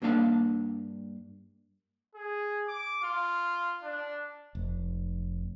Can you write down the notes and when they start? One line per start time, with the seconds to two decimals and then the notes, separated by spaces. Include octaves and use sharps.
0.02 G2 A#3 D4 F5 A5
2.15 G#4
2.68 D6
3.03 F4
3.84 D4
4.55 F1